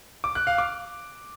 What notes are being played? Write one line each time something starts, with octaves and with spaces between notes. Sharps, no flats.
D6
F#6
F5
D6